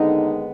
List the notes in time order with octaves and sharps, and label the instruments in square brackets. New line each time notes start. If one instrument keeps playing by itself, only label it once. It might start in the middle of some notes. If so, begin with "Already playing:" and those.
Already playing: [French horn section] D#2 D3 G#3 B3 D#4